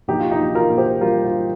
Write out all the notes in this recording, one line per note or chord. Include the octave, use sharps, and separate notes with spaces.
A#1 D#4 G4
F4
D#4 G4
A#1
F4 A#4
A#2
G4 C5
G3 F4 A#4
F4